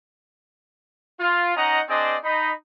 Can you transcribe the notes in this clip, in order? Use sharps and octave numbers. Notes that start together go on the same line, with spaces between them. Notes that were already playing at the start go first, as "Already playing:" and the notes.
F4
C#4 D#4 D#5 F#5 A#5
C4 D4 G#4 C5 D5 D#5
D#4 D#5 B5